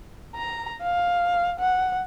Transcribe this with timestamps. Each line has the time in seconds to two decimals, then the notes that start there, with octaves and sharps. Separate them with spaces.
0.35 A#5
0.82 F5
1.60 F#5